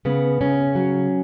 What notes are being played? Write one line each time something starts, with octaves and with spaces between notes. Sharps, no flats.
C#3 B3
C#3 C#4
F#3